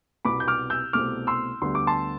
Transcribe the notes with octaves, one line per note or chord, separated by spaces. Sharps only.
C2 B2 B3 B5 D6
G6
D6 F6
E6 G6
C2 B2 A3 C4 D6 F6
C6 E6
D2 D3 G3 B3 D4 C6
D6
A5 C6